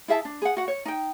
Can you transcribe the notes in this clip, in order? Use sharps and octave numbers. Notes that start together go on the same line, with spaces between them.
E4 G#4 E5 A5
D4
G#4 F#5
F#4 F#5
C#5
D#4 G5